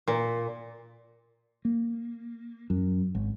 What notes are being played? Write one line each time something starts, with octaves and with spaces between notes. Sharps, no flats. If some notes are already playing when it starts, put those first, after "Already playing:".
A#2
A#3
F#2
G#1